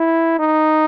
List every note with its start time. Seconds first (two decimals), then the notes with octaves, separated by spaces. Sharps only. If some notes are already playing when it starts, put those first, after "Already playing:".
Already playing: E4
0.39 D#4